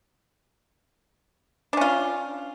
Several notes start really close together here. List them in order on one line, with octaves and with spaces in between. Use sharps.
D4 C#4 F4